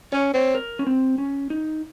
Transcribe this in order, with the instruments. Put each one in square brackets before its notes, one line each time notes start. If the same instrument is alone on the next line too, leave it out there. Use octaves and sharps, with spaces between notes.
[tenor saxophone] C#4 [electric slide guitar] C#5
[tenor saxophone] C4 [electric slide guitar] C#5
[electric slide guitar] A#4
C#4
C4
C#4
D#4